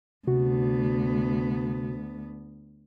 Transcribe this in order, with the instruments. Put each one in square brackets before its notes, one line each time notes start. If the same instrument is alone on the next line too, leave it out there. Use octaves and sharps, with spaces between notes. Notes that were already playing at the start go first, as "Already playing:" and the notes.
[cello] D2 B3 [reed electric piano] C3 F#4